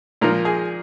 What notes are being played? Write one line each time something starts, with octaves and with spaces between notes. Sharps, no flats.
A#2 F3 A#4
G#4